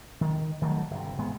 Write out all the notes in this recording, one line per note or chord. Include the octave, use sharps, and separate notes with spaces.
D#3
D#3 F#3 G3 A3
G1 C3
E1 G#2 G#3 B3